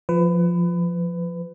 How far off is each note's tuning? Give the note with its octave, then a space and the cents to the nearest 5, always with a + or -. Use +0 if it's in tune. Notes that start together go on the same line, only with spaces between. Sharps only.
F3 +0 B4 +25